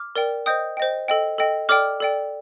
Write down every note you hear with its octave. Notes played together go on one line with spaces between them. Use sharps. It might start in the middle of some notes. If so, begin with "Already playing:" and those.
Already playing: D6 F6
A#4 D5 G5
C5 D#5 G5 D#6 G6
C5 D#5 G5
A4 D#5 G5
A4 D#5 G5
A4 D5 G5 D6 F6
A4 D5 G5